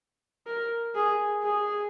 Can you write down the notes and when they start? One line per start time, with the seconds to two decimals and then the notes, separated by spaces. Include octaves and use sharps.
0.47 A#4
0.95 G#4
1.43 G#4